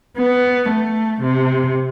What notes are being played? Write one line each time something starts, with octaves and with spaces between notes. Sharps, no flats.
B3
A3
C3